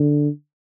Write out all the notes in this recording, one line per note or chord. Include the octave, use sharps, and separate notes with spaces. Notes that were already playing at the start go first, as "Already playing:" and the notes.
Already playing: D3